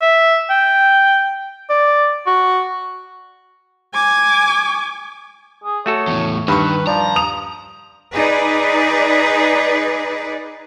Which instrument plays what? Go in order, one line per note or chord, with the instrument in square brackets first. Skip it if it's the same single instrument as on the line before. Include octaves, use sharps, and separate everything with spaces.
[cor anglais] E5
G5
D5
F#4
[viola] G#5 D6
[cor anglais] G#4
[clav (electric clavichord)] A3 F#4 A4 [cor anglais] C#5
[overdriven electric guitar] E2 A2
[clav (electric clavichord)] G2 [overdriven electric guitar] D#3 [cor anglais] B4 [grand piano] B5 C#6
[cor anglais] F3 [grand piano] D5 [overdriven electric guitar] A#5
[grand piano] D#6 F7
[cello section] D#4 G#4 B4 D5